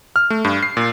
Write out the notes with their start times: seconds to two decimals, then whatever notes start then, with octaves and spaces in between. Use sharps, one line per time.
0.16 F6
0.30 A3
0.45 G2
0.63 C7
0.77 A#2